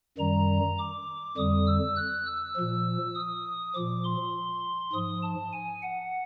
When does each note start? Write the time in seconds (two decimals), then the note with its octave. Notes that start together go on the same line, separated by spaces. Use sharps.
0.18 F#2 D#3 G3 A#5
0.79 D6
1.37 F2 D3 G3 D#6
1.67 E6
1.97 F#6
2.26 E6
2.56 A#2 F3
3.15 D#6
3.75 A#2 F3 D6
4.05 C6
4.93 G#2 F3 D#6
5.22 A5
5.52 G#5
5.82 F#5